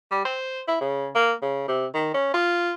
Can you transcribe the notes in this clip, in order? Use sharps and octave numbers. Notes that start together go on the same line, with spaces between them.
G3
C5
E4
C#3
A#3
C#3
C3
D#3
C#4
F4